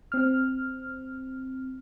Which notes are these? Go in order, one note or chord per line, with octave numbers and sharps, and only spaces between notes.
C4 F6